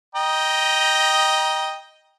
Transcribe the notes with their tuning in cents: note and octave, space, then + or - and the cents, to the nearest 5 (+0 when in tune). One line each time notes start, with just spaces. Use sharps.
D#5 +0 G5 +0 A#5 +25